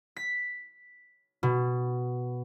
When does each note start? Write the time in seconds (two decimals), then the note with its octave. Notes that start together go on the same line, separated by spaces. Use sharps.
0.17 B6
1.43 B2